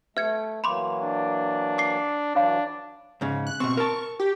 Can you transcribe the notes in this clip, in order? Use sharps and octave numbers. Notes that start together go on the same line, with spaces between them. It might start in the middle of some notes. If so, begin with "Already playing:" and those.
A3 B4 E5 G#6 C#7
E3 F#3 A#3 B5 C6 D6
D4
D6 C7
E3 F#3 D4 C#5 F5 B5
G#2 C#3
F#6
B2 C4 C#6
A#4 A5
G4